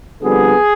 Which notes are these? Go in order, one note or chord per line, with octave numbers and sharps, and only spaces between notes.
F2 D3 G3 B3 G#4